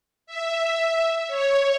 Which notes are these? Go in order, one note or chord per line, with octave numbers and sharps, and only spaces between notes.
E5
C#5